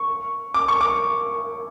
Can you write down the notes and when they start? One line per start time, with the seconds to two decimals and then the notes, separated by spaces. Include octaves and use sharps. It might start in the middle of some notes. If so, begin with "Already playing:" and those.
Already playing: C#6
0.54 D6
0.68 C#6
0.81 D6